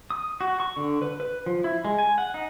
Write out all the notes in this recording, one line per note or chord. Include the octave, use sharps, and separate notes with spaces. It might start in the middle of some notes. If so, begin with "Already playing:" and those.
D#6
F#4
C#6
D3
B4
B4
F3
E4
G#3
G#5
F#5
D#4